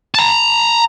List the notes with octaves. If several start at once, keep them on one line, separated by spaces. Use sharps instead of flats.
A5 A#5